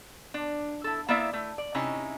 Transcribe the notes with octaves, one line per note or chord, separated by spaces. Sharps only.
D4
E4 A4
A#3 B3 E4 D5 E5
A3 E4
D5
C3 C#4 D#4 E4